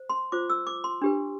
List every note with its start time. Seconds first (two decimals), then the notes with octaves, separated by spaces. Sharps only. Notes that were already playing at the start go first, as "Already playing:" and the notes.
Already playing: C5
0.09 C6
0.32 F4 C5 D6
0.50 E6
0.67 D6
0.84 C6
1.02 D4 G4 B4